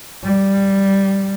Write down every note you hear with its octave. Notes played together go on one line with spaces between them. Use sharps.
G3